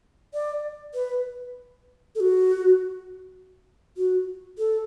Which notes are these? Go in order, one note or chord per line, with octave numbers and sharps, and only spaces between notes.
D5
B4
A4
F#4
F#4
A4